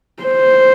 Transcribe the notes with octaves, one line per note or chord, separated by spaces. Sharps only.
C5